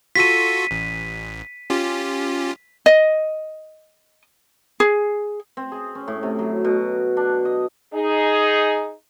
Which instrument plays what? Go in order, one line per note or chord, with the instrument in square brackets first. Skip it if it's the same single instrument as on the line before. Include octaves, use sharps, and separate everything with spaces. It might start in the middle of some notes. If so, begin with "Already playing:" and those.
[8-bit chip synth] F4 F#4 A4 [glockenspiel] B6 D#7
[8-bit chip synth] A1
C#4 F4 G4
[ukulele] D#5
G#4
[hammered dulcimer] C4
G#4
C#4
A2
C3
F#3
B2
D4
D#5
[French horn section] D#4 G#4